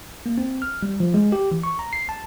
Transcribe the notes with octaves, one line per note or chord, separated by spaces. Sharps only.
A#3
C4
F6
G3
F3
G#3
G4
E3
C#6
A#5
C7
A5